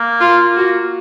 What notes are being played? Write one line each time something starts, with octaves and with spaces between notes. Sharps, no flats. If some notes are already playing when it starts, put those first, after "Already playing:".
Already playing: A#3
F4
F#4